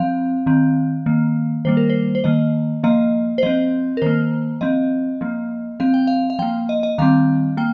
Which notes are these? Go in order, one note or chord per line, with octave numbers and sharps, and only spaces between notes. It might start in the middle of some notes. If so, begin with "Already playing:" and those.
Already playing: F3 C4 F5
D#3 C4
D#3 A#3
D#3 G3 A#3 C5
A#4
C5
C5
D#3 A#3 D#5
F3 A#3 D#5
C5
F3 C4 D#5
A#4
D#3 A#3 C5
F3 C4 D#5
F3 A#3
F3 C4 F5
G5
F5
F5
F3 A#3 G5
D#5
D#5
D#3 G3 C4 F5
A#3 G5